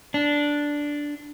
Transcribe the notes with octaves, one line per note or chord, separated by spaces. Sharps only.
D4